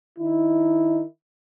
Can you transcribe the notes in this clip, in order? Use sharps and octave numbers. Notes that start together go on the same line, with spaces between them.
D#3 D#4 E4